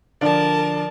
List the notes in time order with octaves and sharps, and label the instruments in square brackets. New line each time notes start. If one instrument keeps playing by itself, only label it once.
[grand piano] D3 F3 [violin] A#4 A5 [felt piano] D5